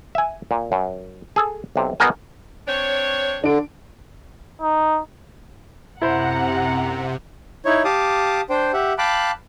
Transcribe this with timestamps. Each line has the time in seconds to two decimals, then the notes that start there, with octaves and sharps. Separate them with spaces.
0.15 E5 G#5
0.51 A#2
0.72 F#2
1.36 G#4 A4
1.76 B1 C3
2.00 B2 B3 D#4 G#4 A#4 G#5
2.67 C4 D4 C#5
3.44 D3 D4 D7
4.61 D#4
6.02 F#2 C3 E4 C5 F#5 A#5
7.65 D#4 E4 C#5
7.85 G4 F5 A5 D6 D#6
8.49 D4 C5 G5
8.73 G4 E5 F#5
8.98 F5 G5 A5 B5 D6 F#6